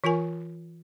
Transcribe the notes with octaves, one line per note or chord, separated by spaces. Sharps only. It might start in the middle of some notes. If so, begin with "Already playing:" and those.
E3 F4 A#4 G#5